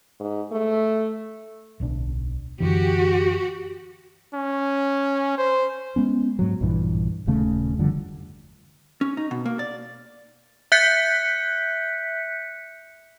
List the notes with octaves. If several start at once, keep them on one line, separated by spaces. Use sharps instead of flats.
G#2
A3
D1 B1 D4
F#2 D3 E3 F#4 G4
C#4
C5
G#3 B3 C#4
G#2 F#3
A#1 G2 E3
D#1 D#2 C#3 A3
F#1 D3 F3 G3
C#4
D#4
B2
A#3
D5
E5 F#6 G6 B6 C#7